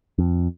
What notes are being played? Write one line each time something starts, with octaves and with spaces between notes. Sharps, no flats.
F2